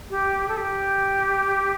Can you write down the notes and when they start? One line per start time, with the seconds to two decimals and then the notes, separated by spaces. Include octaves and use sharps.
0.10 G4
0.48 A4
0.57 G4